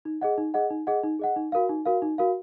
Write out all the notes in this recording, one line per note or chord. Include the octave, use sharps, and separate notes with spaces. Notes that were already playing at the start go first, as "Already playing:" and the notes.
D#4
G#4 D#5 F#5
D#4
G#4 D#5 F#5
D#4
G#4 D#5 F#5
D#4
G#4 D#5 F#5
D#4
F#4 A#4 F5
D#4
F#4 A#4 F5
D#4
F#4 A#4 F5